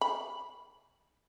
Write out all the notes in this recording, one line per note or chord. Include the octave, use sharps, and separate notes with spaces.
B5